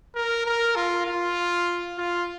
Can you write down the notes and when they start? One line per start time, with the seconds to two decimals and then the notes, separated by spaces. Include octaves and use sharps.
0.15 A#4
0.46 A#4
0.76 F4
1.07 F4
1.98 F4